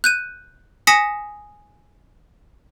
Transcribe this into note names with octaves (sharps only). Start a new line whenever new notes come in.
F#6 G6 D#7
G#5 D#6 A#6 B6 C#7 E7